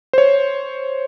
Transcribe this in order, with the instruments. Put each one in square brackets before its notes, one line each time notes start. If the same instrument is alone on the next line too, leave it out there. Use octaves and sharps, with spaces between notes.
[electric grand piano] C5 C#5